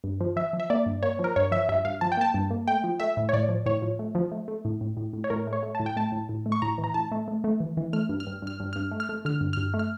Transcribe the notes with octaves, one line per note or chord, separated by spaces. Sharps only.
G2
F3
F3 E5
F3
E5
A#3 D5
G2
A#3 C#5
F3
A#4
G2 C#5
F3 E5
G2 E5
G2 F5
F3 A5
G5
A#3 A5
G2
A#3
A3 G5
F3
A3 E5
A2
C#5
A2 D5
F3
A2 C#5
F3
A3
F3
A3
A3
A2
A2
A2
A2
C#5
A2 A#4
A3
C#5
A3
A5
A2
G5
A3 A5
A2
A2
A3
C#6
A2 A#5
E3
A#5
A2 A5
A3
A3
A3
E3
E3
A3 F6
G2
F6
G2
G2 F6
G2
G2 F6
A3
F6
A3
D3 F6
G2
G2 F6
A3
F6